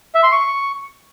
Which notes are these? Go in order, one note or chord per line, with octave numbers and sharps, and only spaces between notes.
E5
C6
C#6